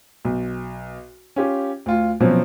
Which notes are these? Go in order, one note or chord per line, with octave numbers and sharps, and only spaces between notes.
B1
C#4 F4 G4
D2 F4
B2 F3 F#3 C4 C#4